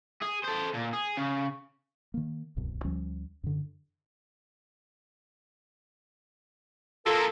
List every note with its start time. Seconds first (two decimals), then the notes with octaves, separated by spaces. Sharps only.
0.22 G#4
0.44 A4 C5
0.74 A#2
0.93 G#4
1.17 C#3
2.14 D#3 A#3
2.56 D1 C2 F#2 B2
2.84 D2 F3 G3 C#4
3.44 F#2 D3
7.06 F3 A#3 F4 A4 A#4 A#5